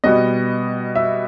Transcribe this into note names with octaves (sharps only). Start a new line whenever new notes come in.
B2 G3 B3 D#5
E5